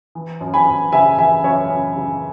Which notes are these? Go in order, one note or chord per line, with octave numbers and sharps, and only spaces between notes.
E3
F#2
G#5 B5
F#2
C#3 E5 G#5
E3 E5 G#5
F#2 C#5 E5
F#2
C#3